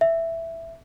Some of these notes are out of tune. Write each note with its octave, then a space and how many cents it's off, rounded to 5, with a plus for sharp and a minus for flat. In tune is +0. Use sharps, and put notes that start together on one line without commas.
E5 +5